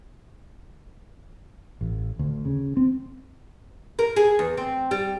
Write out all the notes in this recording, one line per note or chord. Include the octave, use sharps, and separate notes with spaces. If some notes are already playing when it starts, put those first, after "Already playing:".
A1
D2
C#3
C4
A#4
G#4
E2
C4
G3